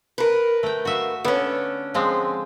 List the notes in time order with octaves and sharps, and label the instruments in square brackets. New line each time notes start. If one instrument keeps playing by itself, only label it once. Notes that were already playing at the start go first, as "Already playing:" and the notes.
[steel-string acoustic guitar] A#4 B4
[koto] A3 G5
F#4 E5 F5
[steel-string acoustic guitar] D3 C#4 [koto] B3
[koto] F3 G#3 C4